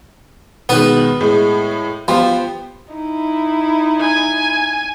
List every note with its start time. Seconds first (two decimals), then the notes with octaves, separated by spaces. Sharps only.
0.69 B2 D#3 G#3 B3 B4
1.21 A2 G#3
2.08 F3 B3 G4 C5
2.92 D#4 E4
4.00 G#5